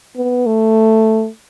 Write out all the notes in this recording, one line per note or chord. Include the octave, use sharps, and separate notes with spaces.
B3
A3